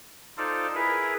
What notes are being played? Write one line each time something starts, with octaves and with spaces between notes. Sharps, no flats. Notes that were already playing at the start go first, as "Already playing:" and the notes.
D#4 F4 A4 C5 D5
E4 G#4 A#4 B4